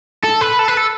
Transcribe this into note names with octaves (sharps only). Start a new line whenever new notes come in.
A4
B4
A4
B4
A4